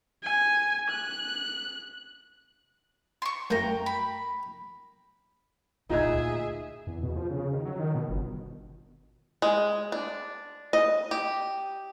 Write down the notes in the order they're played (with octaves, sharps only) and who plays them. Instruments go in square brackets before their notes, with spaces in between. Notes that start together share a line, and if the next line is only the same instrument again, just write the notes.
[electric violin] G#5
F#6
[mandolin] C6 C#6
[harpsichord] F#2 A3 A#3 [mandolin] G5 A#5
[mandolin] B5
[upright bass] D2 A#2 [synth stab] D#4 [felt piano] F4 D#5 G#6 [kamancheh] G#4 E5
[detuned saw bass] E2
B2
F3
C#3
D#3
F#3
D#3
B2
G1
[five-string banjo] G#3
D4
D#5
G4